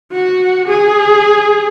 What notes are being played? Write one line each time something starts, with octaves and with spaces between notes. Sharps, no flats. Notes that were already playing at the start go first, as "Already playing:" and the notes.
F#4
G#4